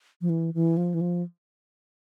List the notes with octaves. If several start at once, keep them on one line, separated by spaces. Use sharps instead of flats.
F3
E3
E3
F3
E3
F3